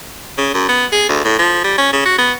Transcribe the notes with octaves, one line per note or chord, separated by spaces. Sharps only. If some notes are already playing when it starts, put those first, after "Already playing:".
C#3
F#2
B3
G#4
D2
A2
F3
G3
C#4
C#3
F#4
B3